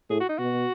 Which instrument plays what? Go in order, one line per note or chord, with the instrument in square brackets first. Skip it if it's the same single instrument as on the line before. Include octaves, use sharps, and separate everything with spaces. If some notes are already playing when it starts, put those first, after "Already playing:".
[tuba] A2 [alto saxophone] G#4
[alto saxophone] F#4
D#4
[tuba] B2 [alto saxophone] F#4